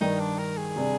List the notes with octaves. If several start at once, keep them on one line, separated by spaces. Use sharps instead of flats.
G2 D#3 G3 D#4
D4
A#4
G#4
C3 G3 D4